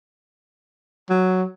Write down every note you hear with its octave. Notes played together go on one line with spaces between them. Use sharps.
F#3